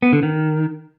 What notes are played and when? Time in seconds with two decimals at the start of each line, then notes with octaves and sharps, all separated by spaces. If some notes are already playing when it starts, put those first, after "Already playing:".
0.02 B3
0.13 D3
0.23 D#3